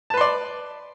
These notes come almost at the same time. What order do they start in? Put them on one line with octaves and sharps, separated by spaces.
A5 B4 C6 D5